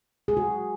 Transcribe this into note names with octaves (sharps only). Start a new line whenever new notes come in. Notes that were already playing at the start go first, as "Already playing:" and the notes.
G#4
F#4